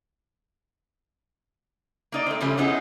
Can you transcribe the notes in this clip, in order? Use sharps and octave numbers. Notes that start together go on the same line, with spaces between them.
A#3 D#4 D5
A3 C4
C#3 F3 G3 A3 C#4
B3 C#4 D#4 E4 G4 G#4